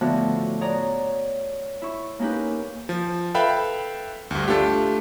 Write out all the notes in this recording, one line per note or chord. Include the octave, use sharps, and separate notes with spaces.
A2 D3 F3 A3 B3 F#4
C#5 D5 F#5 A#5 D#6
E4 C#6
A#3 C#4 D#4 G4 B4
F3
A4 B4 E5 F5 G5 B5
D2 G2
A3 D4 F4 G4